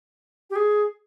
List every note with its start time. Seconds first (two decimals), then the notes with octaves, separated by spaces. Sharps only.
0.50 G4
0.56 G#4